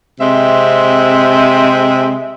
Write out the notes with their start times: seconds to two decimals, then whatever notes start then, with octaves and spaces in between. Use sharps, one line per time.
0.21 C3 G#3 C4 E5